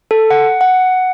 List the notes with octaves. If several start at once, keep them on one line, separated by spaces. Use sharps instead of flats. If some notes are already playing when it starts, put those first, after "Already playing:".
A4
F#5
F#5